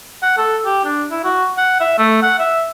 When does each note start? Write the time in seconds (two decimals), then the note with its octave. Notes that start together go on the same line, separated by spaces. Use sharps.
0.22 F#5
0.37 A4
0.65 G4
0.85 D4
1.11 E4
1.24 F#4
1.57 F#5
1.80 E5
1.98 A3
2.22 F#5
2.39 E5